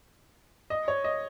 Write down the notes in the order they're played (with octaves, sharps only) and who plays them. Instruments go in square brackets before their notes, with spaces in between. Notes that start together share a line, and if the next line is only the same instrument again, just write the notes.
[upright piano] D#5
C#5
D#5